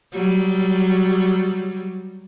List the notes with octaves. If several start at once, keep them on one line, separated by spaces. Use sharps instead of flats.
F#3 G3